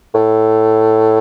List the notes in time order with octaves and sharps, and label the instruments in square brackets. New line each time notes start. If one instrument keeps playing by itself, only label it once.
[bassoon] A2